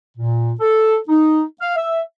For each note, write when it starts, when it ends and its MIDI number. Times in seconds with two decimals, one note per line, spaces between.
0.17 0.53 46
0.60 0.97 69
1.08 1.43 63
1.61 1.73 77
1.76 2.01 76